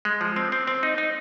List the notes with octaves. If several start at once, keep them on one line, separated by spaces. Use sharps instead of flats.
G#3
F3
C4
C4
C4
D#4
D#4